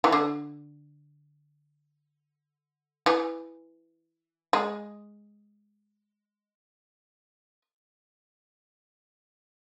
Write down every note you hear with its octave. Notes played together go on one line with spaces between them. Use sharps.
E3
D3
E3
G#3